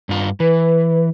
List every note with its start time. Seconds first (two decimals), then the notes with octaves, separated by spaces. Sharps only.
0.09 G2 F4
0.40 E3 B4